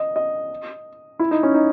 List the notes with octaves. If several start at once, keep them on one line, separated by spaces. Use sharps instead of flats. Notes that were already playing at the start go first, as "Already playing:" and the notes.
Already playing: D#5
D#5
E4
D#4
C#4
D#4